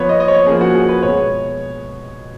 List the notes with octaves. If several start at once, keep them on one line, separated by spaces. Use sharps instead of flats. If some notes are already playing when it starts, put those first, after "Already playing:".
Already playing: F3 B3 C#5
D#5
D#5
C#5
F3 A#3 C#4 G#4
F#4
G#4
B4
B2 G#3 B3 C#5